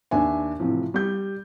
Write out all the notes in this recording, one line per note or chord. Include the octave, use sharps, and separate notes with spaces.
D#2 D4 E5 G#5
A2 C3 E3 F3
G3 G6